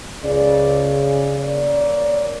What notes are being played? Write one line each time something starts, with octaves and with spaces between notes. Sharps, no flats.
C#2 C#3 D5
A#3 C#5 D5